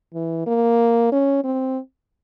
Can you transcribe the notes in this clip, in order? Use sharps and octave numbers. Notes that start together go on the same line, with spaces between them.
E3
A#3
C#4
C4